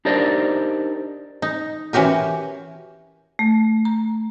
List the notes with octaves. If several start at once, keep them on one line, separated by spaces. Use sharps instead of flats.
D4 D#4 G4 A#4 C5 D5
D#4
E3 C#4 F#4 G4 A#4
A3
A#5